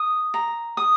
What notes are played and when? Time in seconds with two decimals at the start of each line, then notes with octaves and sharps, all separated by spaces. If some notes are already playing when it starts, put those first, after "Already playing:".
Already playing: D#6
0.34 A#5
0.77 D#6